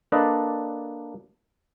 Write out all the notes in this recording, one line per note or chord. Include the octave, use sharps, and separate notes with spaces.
A#3 D4 A4 B4 D5 D#5